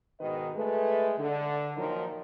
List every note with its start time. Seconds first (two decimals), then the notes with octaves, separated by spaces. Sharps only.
0.20 G#2 B2 D#3 D#4 B4 D#5
0.56 G#3 A3 B4
1.19 D3
1.77 A#2 D#3 F3 F#3 D#4 A#4